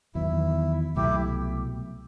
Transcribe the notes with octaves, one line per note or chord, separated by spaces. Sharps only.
E2 D#3 F#3 B3 E4
C2 B2 F#3 A3 E4 G4